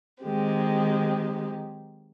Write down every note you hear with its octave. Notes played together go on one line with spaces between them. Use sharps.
D#3 F#3 G#3 C4 G4